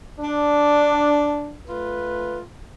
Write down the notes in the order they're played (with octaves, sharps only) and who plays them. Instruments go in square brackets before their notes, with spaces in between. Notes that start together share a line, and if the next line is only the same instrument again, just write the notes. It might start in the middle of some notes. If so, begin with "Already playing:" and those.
[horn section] D4
A3 F4 B4